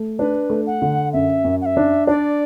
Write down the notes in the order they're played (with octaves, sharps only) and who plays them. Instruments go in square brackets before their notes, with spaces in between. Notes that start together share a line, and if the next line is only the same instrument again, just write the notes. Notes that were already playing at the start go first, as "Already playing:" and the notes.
Already playing: [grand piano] A3
[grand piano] D4 [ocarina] B4
[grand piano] A3
[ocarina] F#5
[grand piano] D3
[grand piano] F#2 [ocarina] E5
[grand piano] F#2
[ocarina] F#5
E5
[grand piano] D4
[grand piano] D4 [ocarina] D5